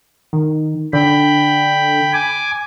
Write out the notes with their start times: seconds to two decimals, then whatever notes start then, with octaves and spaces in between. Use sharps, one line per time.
0.33 D#3
0.93 D3 G5 B5
2.13 G#5 D6